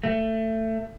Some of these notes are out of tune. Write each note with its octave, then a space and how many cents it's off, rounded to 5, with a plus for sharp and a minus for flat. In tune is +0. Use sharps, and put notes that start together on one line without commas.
A3 +20